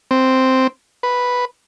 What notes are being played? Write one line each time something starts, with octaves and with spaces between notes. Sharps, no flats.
C4
B4